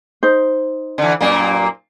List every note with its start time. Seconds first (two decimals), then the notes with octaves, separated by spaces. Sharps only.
0.23 D#4 C5
0.98 D3 E3
1.21 F#2 A#2 A#3